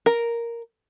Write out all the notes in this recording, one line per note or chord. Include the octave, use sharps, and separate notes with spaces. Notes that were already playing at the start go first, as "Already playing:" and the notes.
A#4